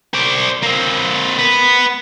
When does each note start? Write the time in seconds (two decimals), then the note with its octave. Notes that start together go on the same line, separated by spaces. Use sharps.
0.14 C5 D5
0.63 A#3 C4
1.39 B3